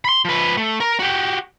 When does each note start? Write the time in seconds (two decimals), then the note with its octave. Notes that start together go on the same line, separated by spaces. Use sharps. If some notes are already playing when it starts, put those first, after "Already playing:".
0.05 B5 C6
0.25 F3 B4
0.57 A3
0.80 A#4
0.99 F#4 G4